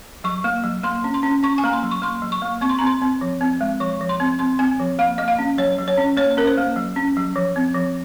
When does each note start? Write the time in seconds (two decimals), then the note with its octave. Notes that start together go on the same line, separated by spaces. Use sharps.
0.24 F#3 C#6
0.44 A#3
0.64 F#3
0.83 A#3 C6
1.04 C#4
1.14 C6
1.23 C#4
1.43 C#4 C#6
1.58 G#5
1.64 A#3 A#5
1.73 C6
1.83 F#3
1.91 C#6
2.02 A#3 C6
2.22 F#3
2.32 C#6
2.42 A#3
2.61 C4 C#6
2.69 C6
2.79 C4 A#5
2.87 C6
3.01 C4
3.21 F3
3.41 C4
3.61 G#3
3.80 F3 C#6
4.01 F3
4.09 C6
4.20 C4
4.39 C4 C6
4.59 C4 G#5
4.80 F3
4.99 A#3 F5
5.18 A#3 D#5
5.28 F5
5.39 C#4
5.58 F#3 C#5
5.78 F#3
5.88 C#5
5.97 C#4
6.17 A#3 C#5
6.37 C#4 A#4
6.47 C5
6.57 A#3
6.76 F#3
6.96 C#4
7.17 F#3
7.36 F3
7.56 C4
7.75 F3